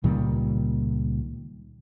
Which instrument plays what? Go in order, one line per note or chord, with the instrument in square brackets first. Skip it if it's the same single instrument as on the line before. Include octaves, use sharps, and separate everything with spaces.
[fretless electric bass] C#2 A#2 D#3 G3